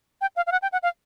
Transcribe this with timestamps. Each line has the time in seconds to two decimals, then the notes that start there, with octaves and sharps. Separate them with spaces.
0.21 G5
0.36 F5
0.47 F5
0.52 F#5
0.62 G5
0.72 F#5
0.83 F5